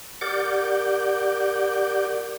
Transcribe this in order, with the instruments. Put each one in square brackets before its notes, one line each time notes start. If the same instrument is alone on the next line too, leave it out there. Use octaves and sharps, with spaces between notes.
[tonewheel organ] G4 A#4 D5 F#5 D6 G6